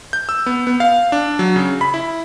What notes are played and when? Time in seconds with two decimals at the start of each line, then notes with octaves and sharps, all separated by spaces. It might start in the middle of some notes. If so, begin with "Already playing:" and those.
0.13 G6
0.29 E6
0.46 B3
0.67 B3
0.80 F5
1.12 D4
1.39 F#3
1.56 C#3
1.81 B5
1.94 E4